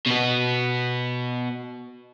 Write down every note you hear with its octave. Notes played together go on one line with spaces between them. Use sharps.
B2 B3